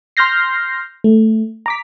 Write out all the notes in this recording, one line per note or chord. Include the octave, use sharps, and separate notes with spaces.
C6 F6 G6 A#6 C7
A3
A#5 D6 B6